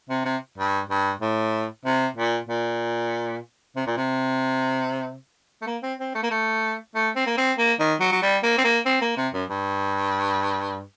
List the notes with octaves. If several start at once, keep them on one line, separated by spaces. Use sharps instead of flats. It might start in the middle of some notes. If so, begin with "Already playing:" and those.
C3
C3
G2
G2
A2
C3
A#2
A#2
C3
A#2
C3
A3
A#3
C4
C4
A3
A#3
A3
A3
C4
A#3
C4
A#3
D#3
F#3
F#3
G3
A#3
C4
A#3
C4
A#3
C3
F#2
G2